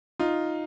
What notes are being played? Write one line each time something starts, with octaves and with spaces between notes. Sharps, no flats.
D#4 F4